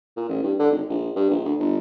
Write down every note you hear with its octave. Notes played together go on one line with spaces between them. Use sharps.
A#2
A1
G2
D3
G#1
A#1
G2
A#1
D2
G1